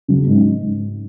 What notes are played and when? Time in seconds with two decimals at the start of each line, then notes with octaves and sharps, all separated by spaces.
0.08 C#3 F#3
0.27 G#2